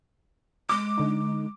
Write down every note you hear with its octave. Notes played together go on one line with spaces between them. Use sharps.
G#3 D6
D3 D#4